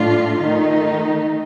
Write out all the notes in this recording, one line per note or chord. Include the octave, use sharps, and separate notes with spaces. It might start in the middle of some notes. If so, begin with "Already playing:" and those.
Already playing: A2 A3 D4 F4
D#3 A3 D#4